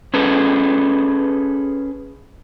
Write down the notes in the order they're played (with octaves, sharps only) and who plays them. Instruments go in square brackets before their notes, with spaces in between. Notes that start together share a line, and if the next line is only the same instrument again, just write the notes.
[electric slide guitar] C#4 G#4 A4 B4